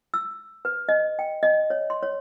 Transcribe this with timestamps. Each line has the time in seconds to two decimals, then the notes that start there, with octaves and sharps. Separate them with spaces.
0.14 E6
0.65 B4
0.89 D#5
1.19 G5
1.43 D#5
1.70 C#5
1.90 C6
2.03 C#5